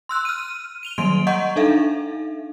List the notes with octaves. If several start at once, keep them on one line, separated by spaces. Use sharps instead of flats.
C6 E6 F#6
F6 D#7
D#7 F7 G7
D#3 F#3 G3 A#3 C6 D7
D#5 F#5 A#5 C#6 G6
D4 D#4 A4 E5 F5